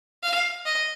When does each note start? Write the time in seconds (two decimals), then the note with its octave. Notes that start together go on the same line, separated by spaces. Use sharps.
0.23 F5
0.65 D#5